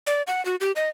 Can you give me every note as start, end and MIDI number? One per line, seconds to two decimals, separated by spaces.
0.07 0.22 74
0.27 0.44 78
0.45 0.56 66
0.61 0.72 67
0.76 0.89 75